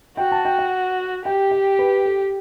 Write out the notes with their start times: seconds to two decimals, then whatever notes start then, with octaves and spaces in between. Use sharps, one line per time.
0.17 F#4 G5
0.32 A5
0.45 G5
0.59 F#5
1.25 G4 G5
1.51 G5
1.79 B4
2.06 A4